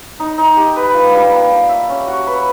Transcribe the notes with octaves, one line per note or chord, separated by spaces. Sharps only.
D#4
D#4
G4
B4
F4
G3
A#3
D4
E5
C#4
F#4
B4